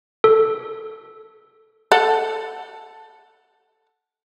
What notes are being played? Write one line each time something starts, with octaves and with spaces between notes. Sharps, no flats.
A4
A4 F#5